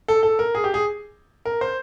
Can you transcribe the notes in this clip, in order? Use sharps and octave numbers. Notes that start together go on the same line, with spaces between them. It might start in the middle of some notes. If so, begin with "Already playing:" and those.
A4
A4
A#4
G#4
G4
G#4
A#4
C5